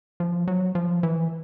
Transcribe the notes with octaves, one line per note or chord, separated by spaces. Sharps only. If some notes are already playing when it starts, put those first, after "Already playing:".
F3
F#3
F3
E3